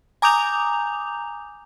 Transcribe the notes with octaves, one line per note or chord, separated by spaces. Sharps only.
G#5 A#5 D6 D#6 G6 F7